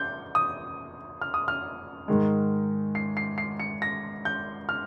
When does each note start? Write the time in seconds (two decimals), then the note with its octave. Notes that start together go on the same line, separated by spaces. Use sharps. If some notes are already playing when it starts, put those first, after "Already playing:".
Already playing: G6
0.35 D#6
1.22 F6
1.34 D#6
1.48 F6
2.08 G#2 D#3 G#3
2.95 C7
3.17 C7
3.38 C7
3.60 C#7
3.82 A#6
4.25 G6
4.69 F6